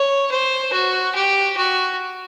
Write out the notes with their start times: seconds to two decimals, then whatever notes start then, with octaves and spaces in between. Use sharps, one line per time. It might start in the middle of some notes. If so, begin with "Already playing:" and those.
Already playing: C#5
0.31 C5
0.73 F#4
1.15 G4
1.57 F#4